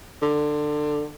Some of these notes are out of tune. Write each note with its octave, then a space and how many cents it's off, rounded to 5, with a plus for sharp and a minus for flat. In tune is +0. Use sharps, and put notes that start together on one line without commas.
D3 +20